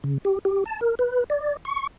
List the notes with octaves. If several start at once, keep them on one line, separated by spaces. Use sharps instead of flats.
C#3
G4
G4
A5
A#4
B4
D5
C#6